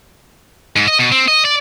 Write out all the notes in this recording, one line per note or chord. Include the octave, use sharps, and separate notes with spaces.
G#2
D#5
B2
C4
D#5
D5